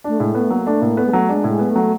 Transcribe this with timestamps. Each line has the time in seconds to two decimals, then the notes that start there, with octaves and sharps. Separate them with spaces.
0.04 A3 D4
0.19 A2 G#3
0.34 A3 B3
0.50 F#3 A#3
0.66 A3 D4
0.81 A2 A#3
0.97 A3 B3
1.06 G#3
1.13 F#3 A3
1.28 G#3 D4
1.44 A2 G#3
1.59 B3
1.70 A3
1.76 F#3